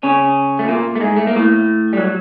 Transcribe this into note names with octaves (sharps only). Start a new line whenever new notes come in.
C#3 C#4
A3
A#2 A#3
A3
G#2 G#3
A3
A#3
A2 A3
G3
F#3